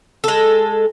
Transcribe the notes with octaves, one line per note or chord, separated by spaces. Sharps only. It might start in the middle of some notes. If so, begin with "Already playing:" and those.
G#3 A4